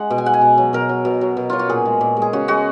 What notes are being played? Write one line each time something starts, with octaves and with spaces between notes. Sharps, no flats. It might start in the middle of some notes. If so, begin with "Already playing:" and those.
Already playing: G#3 F#5
B2
G#5
G#3 F#5
G#5
B2
F#3
B2 A#4
F#3
B2
F#3
B2
F#3 F4
F#4
A#2 G#4
G#3
A#2
G#3
G#4
C#3 F#4
G#3 F#4